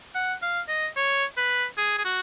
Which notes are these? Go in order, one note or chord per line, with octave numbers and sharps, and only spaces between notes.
F#5
F5
D#5
C#5
B4
G#4
G#4
F#4